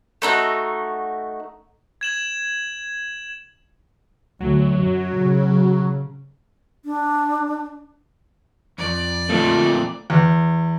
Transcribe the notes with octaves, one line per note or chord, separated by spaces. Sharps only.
A3 D#4 E4 F#4
G#6 E7 F#7
D2 F#3
F#2
C#3
D4
F2 D5
F2 A#2 A3 D#4 F4 A4
E2